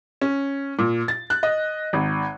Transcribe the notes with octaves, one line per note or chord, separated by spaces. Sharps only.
C#4
A#2
A6
F#6
D#5
G#1